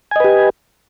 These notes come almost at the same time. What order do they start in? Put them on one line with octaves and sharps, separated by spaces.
G#5 D#5 B4 G4